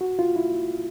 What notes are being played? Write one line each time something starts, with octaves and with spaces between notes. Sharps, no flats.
F#4
F4
E4